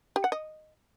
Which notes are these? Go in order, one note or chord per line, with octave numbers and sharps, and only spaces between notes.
G4
F#5
D#5